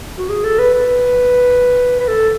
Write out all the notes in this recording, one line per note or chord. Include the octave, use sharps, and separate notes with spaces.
F#4
G#4
A4
B4
B4
B4
A4